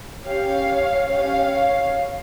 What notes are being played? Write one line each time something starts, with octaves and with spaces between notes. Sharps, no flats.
C#4 G4 C#5 F5
C#4 G4 C#5 F5